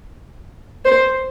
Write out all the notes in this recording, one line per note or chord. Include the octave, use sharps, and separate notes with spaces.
C5